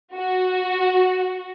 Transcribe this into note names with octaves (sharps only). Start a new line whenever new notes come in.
F#4